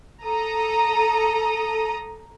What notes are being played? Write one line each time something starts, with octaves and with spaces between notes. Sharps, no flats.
A4 A#5 D#6